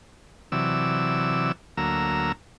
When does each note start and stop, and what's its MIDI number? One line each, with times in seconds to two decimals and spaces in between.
0.52 1.52 48
0.52 1.52 52
0.52 1.52 54
0.52 1.52 74
0.52 1.52 88
1.77 2.32 38
1.77 2.32 54
1.77 2.32 58
1.77 2.32 82
1.77 2.32 88